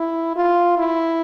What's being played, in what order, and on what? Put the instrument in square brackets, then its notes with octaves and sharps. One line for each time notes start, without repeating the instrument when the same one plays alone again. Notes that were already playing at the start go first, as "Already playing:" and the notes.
Already playing: [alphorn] E4
F4
E4